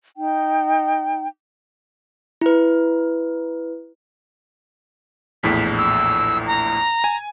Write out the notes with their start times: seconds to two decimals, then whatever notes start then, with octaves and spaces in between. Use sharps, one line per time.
0.18 D#4 G5
2.41 E4 B4
5.43 A#1 E2 A2 B6
5.78 E6
6.47 A#5
7.04 G#5